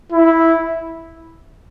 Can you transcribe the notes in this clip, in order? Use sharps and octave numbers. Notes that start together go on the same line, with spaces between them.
E4